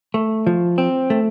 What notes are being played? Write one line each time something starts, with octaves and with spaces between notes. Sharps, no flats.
A3
F3
C4
A3